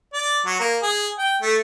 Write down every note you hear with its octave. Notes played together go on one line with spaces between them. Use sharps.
D5
F#3
A#3
G#4
G5
A3